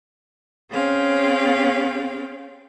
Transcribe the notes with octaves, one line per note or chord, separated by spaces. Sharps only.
C4 C#4 G#4 F5 G5